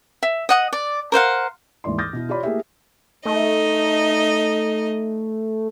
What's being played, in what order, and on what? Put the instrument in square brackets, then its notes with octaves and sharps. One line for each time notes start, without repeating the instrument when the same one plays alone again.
[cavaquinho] E5
D#5 F#5 D#6
D5
A#4 C5 F5 F#5
[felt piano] D#2 G#2 E3 D5 C6
D6 D#6 F6 G6 A6 A#6
B2 E4
F4 G4 C#5 D5 B5
A3 A#3 E4 G4 G#4 E5
[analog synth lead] A3 [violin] D#4 D#5